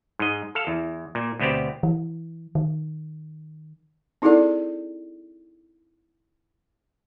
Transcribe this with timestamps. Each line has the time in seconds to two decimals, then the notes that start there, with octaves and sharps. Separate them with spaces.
0.19 G#2 D#5
0.55 A4 F5
0.67 E2
1.15 A#2
1.39 D2 B2 B3 C4 G4
1.83 E3
2.55 D#3
4.22 C4 D#4 E4 G#4 A4 D5